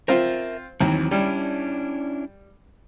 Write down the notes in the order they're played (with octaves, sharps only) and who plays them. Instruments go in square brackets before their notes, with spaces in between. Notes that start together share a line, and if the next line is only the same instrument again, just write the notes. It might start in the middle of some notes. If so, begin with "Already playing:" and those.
[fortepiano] C4 F4 C5 [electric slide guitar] A#4 E5
[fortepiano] D#2 [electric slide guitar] E3 F#3 C4
[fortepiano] G3 [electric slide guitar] C#4 D4 E4